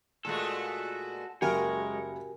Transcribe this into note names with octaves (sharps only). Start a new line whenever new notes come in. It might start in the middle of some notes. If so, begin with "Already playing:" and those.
A#2 G#3 A3 F#4 A4
F#1 G#3 A#3 F#4 G4 A#4 C#5 G#5